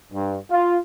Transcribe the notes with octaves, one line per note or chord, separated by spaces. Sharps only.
G2
F4